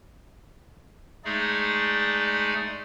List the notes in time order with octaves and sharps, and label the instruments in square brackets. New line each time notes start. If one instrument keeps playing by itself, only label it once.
[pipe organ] G#3 A3 D#4 G#4 D5